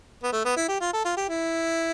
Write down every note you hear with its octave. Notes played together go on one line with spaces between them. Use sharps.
B3
A3
B3
E4
G4
F4
A4
F4
G4
E4